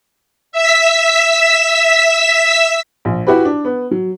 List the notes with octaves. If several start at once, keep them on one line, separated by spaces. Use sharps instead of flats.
E5 E6 B6
A#1
E4 F#4 G4 B4
D4
B3
F#3